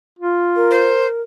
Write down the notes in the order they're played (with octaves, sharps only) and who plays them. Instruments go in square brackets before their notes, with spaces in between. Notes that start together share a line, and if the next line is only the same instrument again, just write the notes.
[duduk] F4
[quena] A#4
[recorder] C5